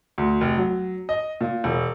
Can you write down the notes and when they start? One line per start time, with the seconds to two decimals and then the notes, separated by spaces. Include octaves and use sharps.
0.18 D2
0.41 F1
0.57 F#3
1.09 D#5
1.41 A#2
1.64 E1